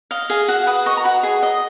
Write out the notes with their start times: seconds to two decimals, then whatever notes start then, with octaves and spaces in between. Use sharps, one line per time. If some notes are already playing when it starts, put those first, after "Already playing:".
0.11 D#5 F5
0.30 G#4 F5
0.48 F#4 F#5
0.67 B4 D#6
0.86 D#5 C#6
0.97 A#5
1.05 F#4 B5
1.23 G#4
1.43 D#5